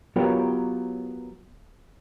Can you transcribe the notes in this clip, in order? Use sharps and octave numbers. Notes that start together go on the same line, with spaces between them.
F#3 B3 F4 G4 A#4 C#5